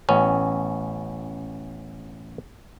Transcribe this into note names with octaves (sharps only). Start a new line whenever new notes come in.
A1 B3 C#4